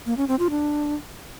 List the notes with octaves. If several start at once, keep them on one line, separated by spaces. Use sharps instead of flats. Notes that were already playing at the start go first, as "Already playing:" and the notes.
A#3
C#4
C4
F4
D4